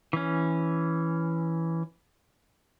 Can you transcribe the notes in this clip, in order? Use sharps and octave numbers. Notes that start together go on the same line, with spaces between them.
E3 C#4